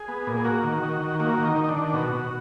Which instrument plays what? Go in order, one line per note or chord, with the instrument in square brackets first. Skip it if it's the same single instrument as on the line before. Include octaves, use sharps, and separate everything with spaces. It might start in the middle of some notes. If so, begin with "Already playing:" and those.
Already playing: [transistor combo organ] G#4
B3
A#2
G#4
A#3 F#4
D#3
D#3
D#3
A#3 F#4
D#3
D#4
D#3
D#4
D4
D#3
B2 F#4
B2